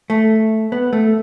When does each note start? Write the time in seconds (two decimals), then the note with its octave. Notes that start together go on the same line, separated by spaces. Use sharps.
0.10 A3
0.72 B3
0.93 A3